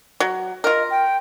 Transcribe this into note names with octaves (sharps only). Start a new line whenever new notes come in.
F#3
F4 A#4 D#5
G5